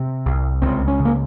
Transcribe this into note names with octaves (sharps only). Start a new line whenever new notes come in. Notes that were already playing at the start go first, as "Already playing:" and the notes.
Already playing: C3 C4
C2
C#2 C4
C#4
C#3
A#3